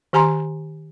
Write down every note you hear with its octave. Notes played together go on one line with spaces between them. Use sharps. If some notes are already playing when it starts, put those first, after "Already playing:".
D#3 G4 G#5 A#5 C6